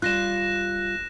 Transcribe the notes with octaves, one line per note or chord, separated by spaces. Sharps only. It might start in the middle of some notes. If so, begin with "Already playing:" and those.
G3 F4 F#6 A#6 E7